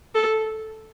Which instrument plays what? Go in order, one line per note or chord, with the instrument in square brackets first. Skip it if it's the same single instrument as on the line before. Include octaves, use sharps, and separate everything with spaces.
[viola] A4